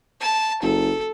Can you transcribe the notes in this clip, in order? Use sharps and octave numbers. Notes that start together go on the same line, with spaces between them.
A5
F#1 A4